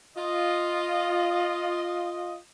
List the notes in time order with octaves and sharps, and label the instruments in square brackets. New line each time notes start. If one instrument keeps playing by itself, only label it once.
[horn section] F4 D#5